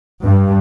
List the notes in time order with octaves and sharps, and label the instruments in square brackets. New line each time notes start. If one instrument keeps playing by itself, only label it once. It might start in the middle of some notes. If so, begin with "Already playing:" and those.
[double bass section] G2